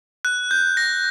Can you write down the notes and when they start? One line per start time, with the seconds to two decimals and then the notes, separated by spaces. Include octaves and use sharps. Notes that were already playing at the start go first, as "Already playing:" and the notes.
0.25 F#6
0.51 G6
0.77 A#6